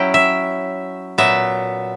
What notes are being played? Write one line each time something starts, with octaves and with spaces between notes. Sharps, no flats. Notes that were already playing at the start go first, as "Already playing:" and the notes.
Already playing: F#3 C#4 E4 G5
E5
A#2 F#3 B3 E5